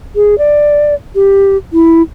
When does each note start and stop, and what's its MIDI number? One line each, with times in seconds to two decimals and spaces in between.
0.15 0.38 68
0.38 0.94 74
1.15 1.57 67
1.72 2.02 64